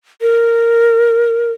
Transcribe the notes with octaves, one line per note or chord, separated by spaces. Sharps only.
A#4